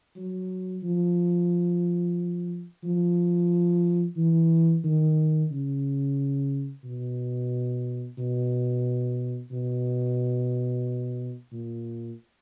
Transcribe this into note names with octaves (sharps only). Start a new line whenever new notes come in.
F#3
F3
F3
E3
D#3
C#3
B2
B2
B2
A#2